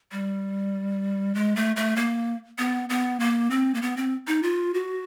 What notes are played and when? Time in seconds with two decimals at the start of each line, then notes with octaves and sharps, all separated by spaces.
0.12 G3
1.35 G#3
1.56 A3
1.76 A3
1.96 A#3
2.58 B3
2.89 B3
3.20 A#3
3.50 C4
3.74 A#3
3.82 B3
3.97 C4
4.27 D#4
4.43 F4
4.74 F#4